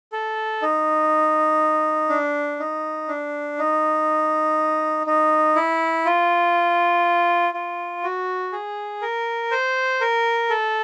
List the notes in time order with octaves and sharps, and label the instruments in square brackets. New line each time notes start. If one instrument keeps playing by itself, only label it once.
[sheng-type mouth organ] A4
D#4
D4
D#4
D4
D#4
D#4
E4
F4
F4
F#4
G#4
A#4
C5
A#4
A4